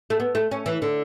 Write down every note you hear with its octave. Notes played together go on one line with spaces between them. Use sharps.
A3
B3
A3
C#4
E3
D3